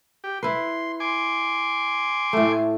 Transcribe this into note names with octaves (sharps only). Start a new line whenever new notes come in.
G4
E4 B4 C6
G#5 C6 D6
A2 A3